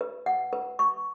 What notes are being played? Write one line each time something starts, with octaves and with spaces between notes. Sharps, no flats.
B4
F#5
B4
C#6